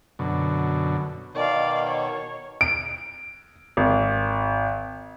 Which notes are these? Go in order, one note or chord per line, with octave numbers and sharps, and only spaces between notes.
F#2 B2 D3
B2 D#3 D5 F5
C#5
D7
G#1